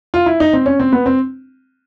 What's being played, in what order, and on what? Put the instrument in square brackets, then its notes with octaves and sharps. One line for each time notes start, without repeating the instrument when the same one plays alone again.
[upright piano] F4
E4
D#4
C4
C#4
C4
B3
C4